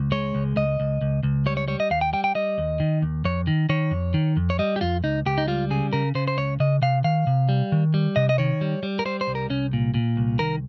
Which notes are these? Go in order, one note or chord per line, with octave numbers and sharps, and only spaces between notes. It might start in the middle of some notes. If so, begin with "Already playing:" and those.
Already playing: C#2
G#3 C#5
C#2
C#2 D#5
C#2
C#2
C#2
G3 C#5
C#5
G3 C#5
D#5
D#2 F5
G5
G3 G5
G5
G3 D#5
D#2
D#3
D#2
F2 C#5
D#3
D#3 C#5
F2
D#3
F2
C#5
G3 D#5
G4
F2 F4
C#2 D#4
C#2 G4
D#4
G3 F4
C#3 G#4
C#3 A#4
C#3 C5
C5
C#2 C#5
C#3 D#5
C3 F5
D#3 F5
C3
G3
D#3
G3
C3 D#5
D#5
D#3 C#5
G3
G3
A#4
G3 C5
C5
C2
A#4
C2 C#4
A#2
A#2
C2
D#3 A#4